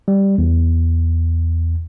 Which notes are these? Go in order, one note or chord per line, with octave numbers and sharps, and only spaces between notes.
G3
E2